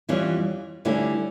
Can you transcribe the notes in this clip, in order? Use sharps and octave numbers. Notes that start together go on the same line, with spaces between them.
F2 E3 G3 C#4 E4
D2 D3 G3 C#4 E4